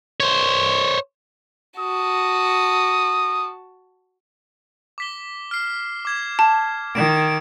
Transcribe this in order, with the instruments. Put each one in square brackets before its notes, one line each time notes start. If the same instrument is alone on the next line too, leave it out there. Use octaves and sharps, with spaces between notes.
[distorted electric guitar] C5 C#5
[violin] F#4 A5 [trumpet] D#6
[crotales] D6 B6 G7
F6 C7
D6 G#6
[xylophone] A5
[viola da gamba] D#3 [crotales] D7 E7